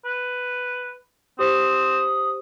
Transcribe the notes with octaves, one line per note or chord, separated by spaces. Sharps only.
B4
C4 G4 C5 D#6